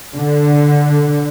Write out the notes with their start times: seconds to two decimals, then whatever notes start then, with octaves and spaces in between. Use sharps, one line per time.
0.14 D3